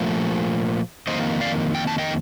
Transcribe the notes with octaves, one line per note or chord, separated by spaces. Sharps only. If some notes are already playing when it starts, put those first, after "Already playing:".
Already playing: A#2 F3 A3
F2 D#3 A#3 C5 D#5
D5 F5
G5
A5
D#5 G5